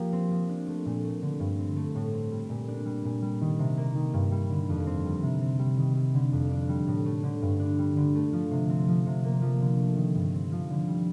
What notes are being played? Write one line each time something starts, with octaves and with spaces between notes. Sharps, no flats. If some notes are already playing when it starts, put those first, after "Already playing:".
Already playing: F3 A#3 G4
C4
F3
D4
A3
A#2
A3
D3
G2
C4
A3
A2
C4
G3
A#2
D4
G3
A#2
G3
D#3
C3
A#3
D#3
G2
G3
D3
F2
C4
G3
C3
C4
G3
D#3
G3
D3
F2
D4
G3
A2
A3
D3
G2
D4
G3
D3
A3
F3
C3
C4
F3
C3
A#3
F3
D3
A3
D#3
G2
C4
F3
D3
G3